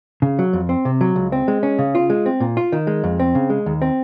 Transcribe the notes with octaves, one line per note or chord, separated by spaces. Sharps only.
C#3
F#3
F2
C4
C3
F#3
C#2
C4
G#3
C#4
C#3
F4
G#3
C4
A#2
F4
D#3
G#3
F2
C4
C#3
G#3
D#2
C4